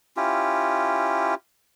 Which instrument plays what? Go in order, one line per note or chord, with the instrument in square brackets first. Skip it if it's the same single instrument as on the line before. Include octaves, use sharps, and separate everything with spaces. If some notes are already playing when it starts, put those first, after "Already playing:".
[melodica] C#4 E4 F4 G4